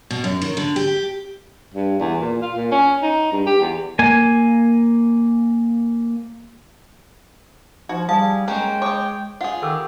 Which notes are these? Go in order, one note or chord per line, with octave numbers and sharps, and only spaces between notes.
B2
F#2
D#3
D3
G4
G2
E2
A#2
F4
A#2
C#4
D#4
G2
G4
E2
A#3 G#5
F3 D#4 F#4
G3 G#4 F5 G#5 A5
F#3 G#3 A#3 C#4 G5
C5 C#5 D6 D#6
F4 G#4 F#5
D#3 G4 A4 E6